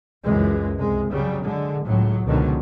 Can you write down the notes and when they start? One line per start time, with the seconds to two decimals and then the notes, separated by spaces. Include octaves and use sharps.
0.24 C#2 F#2 E3 G#3
0.77 C2 G#3
1.11 C#3 F#3 G3
1.45 D3 G#3
1.85 C#2 A2 F#3
2.26 C#2 B2 D3 D#3 F3 F#3